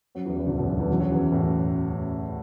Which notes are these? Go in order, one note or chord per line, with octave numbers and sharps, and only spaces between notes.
F#2 F#3
E2 E3
E2 E3
D2 D3
B1 B2
B1 B2
E2 E3
F#2 F#3
F#2 F#3
E2 E3
A1 A2